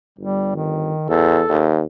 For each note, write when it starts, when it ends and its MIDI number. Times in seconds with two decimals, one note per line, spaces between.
0.18 0.91 31
0.18 0.55 55
0.56 1.05 51
1.09 1.42 40
1.09 1.72 69
1.49 1.83 39